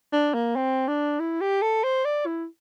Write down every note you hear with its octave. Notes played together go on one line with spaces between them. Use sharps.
D4
A#3
C4
D4
E4
G4
A4
C5
D5
E4